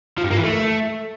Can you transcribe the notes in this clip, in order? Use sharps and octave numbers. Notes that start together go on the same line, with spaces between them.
F3
G2
A#3
E3
A3